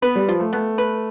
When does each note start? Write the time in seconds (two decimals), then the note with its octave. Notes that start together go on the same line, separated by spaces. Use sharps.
0.02 B3 B4
0.15 G3
0.28 F3 F4
0.40 A3
0.53 A3 B3
0.78 B4